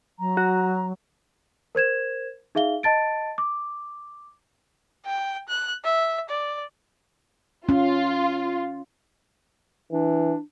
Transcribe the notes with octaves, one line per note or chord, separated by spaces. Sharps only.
F#3 A#5
F#4
A#4 C5 G#6 E7
D#4 G#4 E5 F5 G7
D#5 A5 A6 D7
D6
G5
F#6
E5
D5
C#4 F4
E3 D4